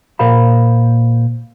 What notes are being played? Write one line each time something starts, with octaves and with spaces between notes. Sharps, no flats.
A#2 A#4 C5 F5 B5